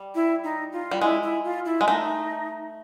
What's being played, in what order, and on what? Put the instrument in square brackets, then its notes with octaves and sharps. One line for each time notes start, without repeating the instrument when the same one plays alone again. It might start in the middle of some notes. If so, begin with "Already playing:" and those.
Already playing: [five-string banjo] G3
[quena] E4
D#4
F4
[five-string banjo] G3
[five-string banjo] G#3 [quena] E4
[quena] E4
F4
E4
[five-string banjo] G#3
[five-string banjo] A3 [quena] D#4